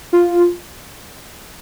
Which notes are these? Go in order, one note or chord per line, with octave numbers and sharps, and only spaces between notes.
F4